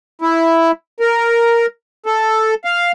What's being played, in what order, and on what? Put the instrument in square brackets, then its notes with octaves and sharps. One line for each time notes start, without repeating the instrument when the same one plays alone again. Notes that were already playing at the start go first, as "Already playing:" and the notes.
[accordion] E4
A#4
A4
F5